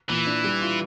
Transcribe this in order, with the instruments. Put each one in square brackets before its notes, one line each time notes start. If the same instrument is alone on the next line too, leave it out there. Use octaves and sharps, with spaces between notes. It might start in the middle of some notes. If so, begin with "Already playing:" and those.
[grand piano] A#2 [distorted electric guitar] E3
[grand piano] D4
G3
F4